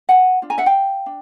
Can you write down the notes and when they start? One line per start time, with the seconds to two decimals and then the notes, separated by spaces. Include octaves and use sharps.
0.09 F#5 G#5
0.42 D4 F4
0.50 G#5 A#5
0.58 E5 F#5
0.66 F5 G5
1.06 D4